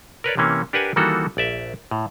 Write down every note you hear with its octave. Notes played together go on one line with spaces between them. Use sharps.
A#4 B4 C#5 D5
C3 E3 A#3 C#4
D4 G4 A#4 B4 F#5 G#5
D#3 E3 G3 A#3 F#4 A4
A#1 D5 E5
A2